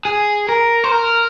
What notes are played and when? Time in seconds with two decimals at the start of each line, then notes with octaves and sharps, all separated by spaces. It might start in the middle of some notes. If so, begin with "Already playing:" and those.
0.05 G#4
0.49 A#4
0.84 C5
0.92 A#4